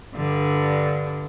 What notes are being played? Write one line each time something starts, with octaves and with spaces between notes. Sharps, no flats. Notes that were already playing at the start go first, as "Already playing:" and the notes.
G2 D3